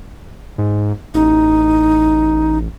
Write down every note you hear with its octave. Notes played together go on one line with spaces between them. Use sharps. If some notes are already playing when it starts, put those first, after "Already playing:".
G#2
A1 D#4